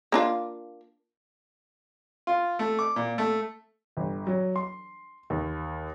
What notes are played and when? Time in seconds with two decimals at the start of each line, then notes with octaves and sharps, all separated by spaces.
0.12 A#3 D4 F4
2.27 F4
2.59 A3
2.79 D6
2.96 A#2
3.18 A3
3.97 G1
4.27 F#3
4.56 C6
5.30 D#2